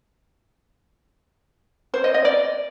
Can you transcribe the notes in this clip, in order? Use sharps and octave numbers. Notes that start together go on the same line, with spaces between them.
C5
D#5
D#5
D5